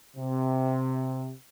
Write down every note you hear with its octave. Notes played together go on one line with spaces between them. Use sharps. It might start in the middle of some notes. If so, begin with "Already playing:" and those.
C3